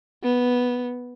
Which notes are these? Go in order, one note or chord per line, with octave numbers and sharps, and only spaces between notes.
B3